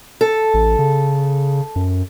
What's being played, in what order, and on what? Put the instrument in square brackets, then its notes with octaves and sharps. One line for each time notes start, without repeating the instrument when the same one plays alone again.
[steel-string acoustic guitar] A4
[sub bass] A1
C#3
F#2